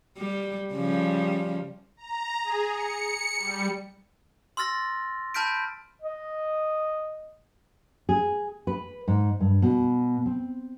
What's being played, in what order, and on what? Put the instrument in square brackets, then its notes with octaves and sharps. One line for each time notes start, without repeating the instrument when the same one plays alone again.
[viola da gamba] G3
C#3 F3 G3
[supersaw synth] A#5
G#4
C#7
G3
[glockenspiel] C6 E6 F6 A6 A#6
A5 B5 F6 G6 B6 D7
[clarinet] D#5
[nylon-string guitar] G#4
B4
G#2
G2
B2
C4